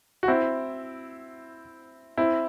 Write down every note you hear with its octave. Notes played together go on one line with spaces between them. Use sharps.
F#4
C4 E4
C4 E4